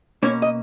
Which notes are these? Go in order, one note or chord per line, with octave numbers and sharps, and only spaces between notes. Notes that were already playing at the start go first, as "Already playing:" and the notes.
B2 A#3 C#4 C#5
D#5